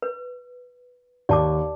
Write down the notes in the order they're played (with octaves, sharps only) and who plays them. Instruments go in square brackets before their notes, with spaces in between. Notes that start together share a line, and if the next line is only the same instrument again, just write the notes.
[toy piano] B4
[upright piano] D#2 [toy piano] D5 A5 D6